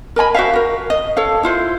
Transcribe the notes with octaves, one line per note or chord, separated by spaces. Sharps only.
A#4 D#5 G#5 B5
F#4 C5 E5 F5
F#4 A#4
D#5
A4 C#5 F5
E4 F4 C5